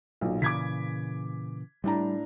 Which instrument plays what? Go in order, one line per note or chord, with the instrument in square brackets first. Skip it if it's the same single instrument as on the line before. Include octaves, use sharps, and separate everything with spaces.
[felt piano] B1 A#2
[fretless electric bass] A#2 C#3 E3 [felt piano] D6 G#6 B6
[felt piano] A2 D4 A#5 [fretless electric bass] G3